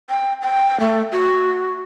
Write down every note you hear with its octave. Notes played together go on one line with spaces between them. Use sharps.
G5
G5
A3
F#4